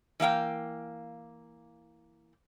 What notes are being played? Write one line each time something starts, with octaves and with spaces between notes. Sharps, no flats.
E3 A#3 F5 G5